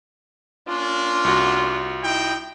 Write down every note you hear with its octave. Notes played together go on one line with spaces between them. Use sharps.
A#3 C#4 D4 F4
C2 F#4
D#4 E4 G5